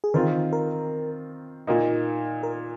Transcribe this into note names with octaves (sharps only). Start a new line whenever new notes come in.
G#4
D#3 C4 F4 A#4
A#4
A#2 A#3 D#4
A#4